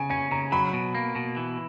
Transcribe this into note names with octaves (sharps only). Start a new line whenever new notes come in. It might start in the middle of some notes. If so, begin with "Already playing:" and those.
Already playing: C#3 G#5
C#4 G#5
C#3 A#5
F#3 B5
B2
A#3
B2
E3